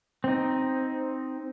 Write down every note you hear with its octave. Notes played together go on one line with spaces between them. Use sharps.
C4 D#4